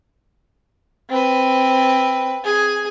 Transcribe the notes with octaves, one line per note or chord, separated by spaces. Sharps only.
C4 B4
G#4